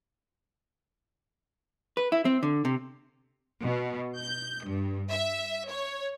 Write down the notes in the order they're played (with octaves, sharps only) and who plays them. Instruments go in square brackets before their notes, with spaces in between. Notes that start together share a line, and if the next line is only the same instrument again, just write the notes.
[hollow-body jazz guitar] B4
E4
C4
D3
C3
[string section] B2
G6
G2
E5
C#5